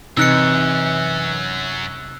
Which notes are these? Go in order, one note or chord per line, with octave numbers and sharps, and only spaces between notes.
F#2 C3 E3 D#4 E6 F#6 C#7